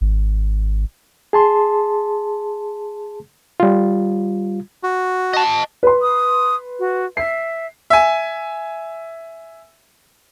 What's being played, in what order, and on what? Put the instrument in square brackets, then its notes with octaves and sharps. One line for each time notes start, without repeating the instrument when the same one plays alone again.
[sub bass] G#1
[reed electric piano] G#4 A5 C6
G3 F4
[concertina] F#4
[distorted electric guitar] D#5 A5
[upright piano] B4 C6
[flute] D#6
F#4
[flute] E5 [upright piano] C7
[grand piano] E5 G#5